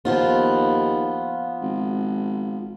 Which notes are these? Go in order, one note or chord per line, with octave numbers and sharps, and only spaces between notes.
D#2 F3 B3 F4
G#1